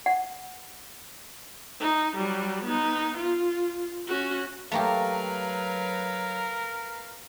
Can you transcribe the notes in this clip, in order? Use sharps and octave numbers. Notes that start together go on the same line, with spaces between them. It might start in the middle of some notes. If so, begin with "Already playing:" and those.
F#5
D#4
F#3 G3
B3 D#4
F4
C#4 F#4
F#3 A3 A#3 G4 A#4 B4 F5